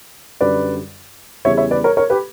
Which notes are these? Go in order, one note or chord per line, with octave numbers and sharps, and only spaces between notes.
F#2 D3 G3 B4 D5
E2 C#3 E3 G3 C#5 E5
C#5 E5
B4 D5
A#4 C#5
A#4 C#5
G4 B4